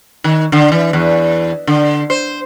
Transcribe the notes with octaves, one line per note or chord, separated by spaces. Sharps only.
D#3
D3
E3
E2
D3
C5